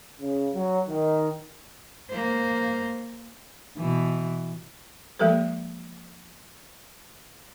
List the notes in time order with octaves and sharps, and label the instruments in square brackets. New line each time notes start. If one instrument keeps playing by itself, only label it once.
[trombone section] C#3
F#3
D#3
[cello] A#3 C5
[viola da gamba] B2 E3
[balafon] F3 G#3 A#3 G4 A4 B4